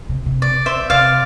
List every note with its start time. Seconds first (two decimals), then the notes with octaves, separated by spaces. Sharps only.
0.09 C3
0.26 C3
0.42 D5
0.66 C5 E5
0.90 C3 D5 F5